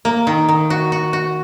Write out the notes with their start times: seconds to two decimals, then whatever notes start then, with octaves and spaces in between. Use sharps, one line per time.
0.05 A#3
0.27 D#3
0.49 D#3
0.70 F#4
0.92 F#4
1.13 F#4